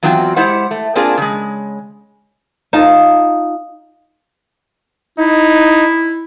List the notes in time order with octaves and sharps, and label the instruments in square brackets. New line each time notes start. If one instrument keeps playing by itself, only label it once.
[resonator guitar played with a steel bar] E2 F#3 C4 F4 F#4 G5
G#3 E4 G4 C5 F#5
A3
A#3 C4 D4 F4 G#4 A#4
C#3 G#3
[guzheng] D#4 F4 A5
[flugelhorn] D#4 [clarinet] E4